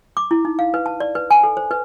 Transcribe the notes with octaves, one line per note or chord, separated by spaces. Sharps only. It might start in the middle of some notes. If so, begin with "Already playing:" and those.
D6
E4
D#4
F5
B4
A5
D5
B4
G#5
A4
C5
B4